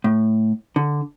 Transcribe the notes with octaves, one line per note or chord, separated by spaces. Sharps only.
A2
D3